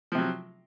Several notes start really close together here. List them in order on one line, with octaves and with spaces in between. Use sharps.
F3 C3 F#3